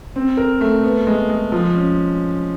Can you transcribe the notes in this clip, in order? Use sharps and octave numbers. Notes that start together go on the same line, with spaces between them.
C4
A#4
A3
B3
G#3
G#3
F3
C#4